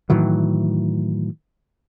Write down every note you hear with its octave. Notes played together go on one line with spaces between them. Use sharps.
A2 D#3 E3 F#3